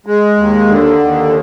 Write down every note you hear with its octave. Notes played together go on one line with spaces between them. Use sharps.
G#3
D#2
D3
D#2